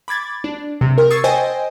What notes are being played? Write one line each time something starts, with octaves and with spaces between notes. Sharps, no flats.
B5 D6 G#6 A6
D4
C3
A#4
C#6 D#6 E6 G#6 A6 C7
C5 D#5 G5 G#5